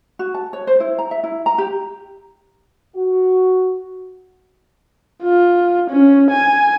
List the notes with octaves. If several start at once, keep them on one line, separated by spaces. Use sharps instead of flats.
F#4
A5
C#5
C5
E4
A#5
E5
E4
A#5
G4
F#4
F4
C#4
G#5